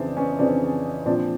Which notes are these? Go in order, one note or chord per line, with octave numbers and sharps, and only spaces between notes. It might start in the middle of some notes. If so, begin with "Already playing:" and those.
Already playing: F2 C#3 E3 C4 D4
B3 C#4
F2 C#3 E3 C4 D4
A#2 F3 C4 D4